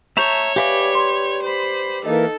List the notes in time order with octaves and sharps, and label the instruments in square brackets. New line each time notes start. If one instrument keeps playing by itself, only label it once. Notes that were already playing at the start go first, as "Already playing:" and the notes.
[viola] C#5 [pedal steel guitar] E5 A5 A#5 [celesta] C#6 G6
[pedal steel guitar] G4 B4 D5 [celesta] E5 F5 G#5
[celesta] C6
[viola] C5 B5
[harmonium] E3 A#3 [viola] D#4 A4 [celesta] D#5